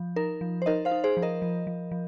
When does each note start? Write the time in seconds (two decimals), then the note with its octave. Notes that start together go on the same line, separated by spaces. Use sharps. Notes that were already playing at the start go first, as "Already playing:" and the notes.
Already playing: F3
0.16 D#4 A#4
0.41 F3
0.62 C5
0.66 D#4 A#4 D#5
0.85 C5 F5
0.91 D#4
1.04 G#4 C5
1.17 F3
1.22 A#4 D#5
1.42 F3
1.67 F3
1.91 F3